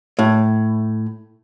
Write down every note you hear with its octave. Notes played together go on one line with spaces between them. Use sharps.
A2